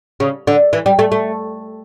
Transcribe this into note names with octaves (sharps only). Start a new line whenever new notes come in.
C#3
D3
E3
G3
A3
A3